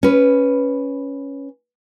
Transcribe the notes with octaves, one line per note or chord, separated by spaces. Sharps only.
C#4 B4